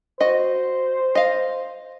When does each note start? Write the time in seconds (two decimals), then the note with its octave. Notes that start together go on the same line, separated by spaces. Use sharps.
0.20 F#4 C5 D#5
1.15 D#5 F5